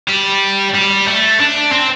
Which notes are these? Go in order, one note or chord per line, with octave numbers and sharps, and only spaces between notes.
G3
G3
A3
D4
C4